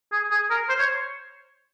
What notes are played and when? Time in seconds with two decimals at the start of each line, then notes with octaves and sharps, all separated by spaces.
0.12 G#4
0.31 G#4
0.50 A#4
0.69 C5
0.79 C#5